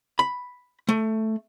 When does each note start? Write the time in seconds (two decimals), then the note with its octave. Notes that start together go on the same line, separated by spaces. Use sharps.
0.19 B5
0.89 A3